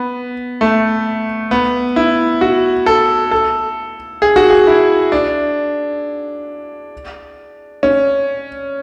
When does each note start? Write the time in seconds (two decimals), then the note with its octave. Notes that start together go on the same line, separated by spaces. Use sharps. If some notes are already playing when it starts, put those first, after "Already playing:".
Already playing: B3
0.61 A3
1.51 B3
1.96 E4
2.41 F#4
2.86 A4
3.31 A4
4.22 G#4
4.36 F#4
4.50 G#4
4.67 E4
5.12 D4
7.83 C#4